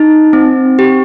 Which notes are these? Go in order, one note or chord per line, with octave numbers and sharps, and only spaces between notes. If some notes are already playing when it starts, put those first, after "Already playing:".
Already playing: D#4
C4
G4